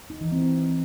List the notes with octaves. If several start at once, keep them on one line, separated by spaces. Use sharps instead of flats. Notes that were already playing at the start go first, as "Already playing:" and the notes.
D#4
E3
C4